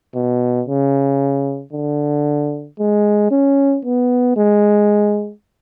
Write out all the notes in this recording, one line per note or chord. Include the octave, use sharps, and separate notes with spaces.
B2
C#3
D3
G#3
C#4
B3
G#3